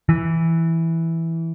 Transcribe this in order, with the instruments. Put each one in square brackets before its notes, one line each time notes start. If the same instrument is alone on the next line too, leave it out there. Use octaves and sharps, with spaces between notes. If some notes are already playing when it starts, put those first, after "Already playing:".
[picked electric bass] E3